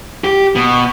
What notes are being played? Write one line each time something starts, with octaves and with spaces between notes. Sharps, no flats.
G4
B2